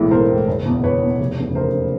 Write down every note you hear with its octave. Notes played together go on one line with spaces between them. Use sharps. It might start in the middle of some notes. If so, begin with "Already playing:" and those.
Already playing: B1 A2 E3 G#3
B1 A#4 C5
A2 E3 G#3
F#1
E2 B2
F#1 B4 C#5
E2 B2
F1
E2 C#3
F1 A#4 C5
C#3